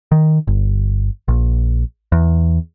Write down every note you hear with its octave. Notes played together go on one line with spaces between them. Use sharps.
D#3
G1
A#1
E2